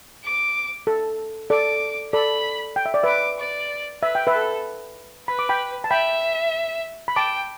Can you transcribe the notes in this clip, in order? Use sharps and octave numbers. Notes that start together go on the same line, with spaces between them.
D6
A4
A4 D5 D6
A4 D5 B5
G5
E5
D5
B4 E5 D6
D5
B4 E5
G5
B4 E5
A4
B4 B5
D6
G5 B5
A5
E5 G5 B5
B5
G5 A5 D6